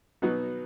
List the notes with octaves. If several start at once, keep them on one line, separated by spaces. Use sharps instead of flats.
B2 F#3 B3 D#4 F#4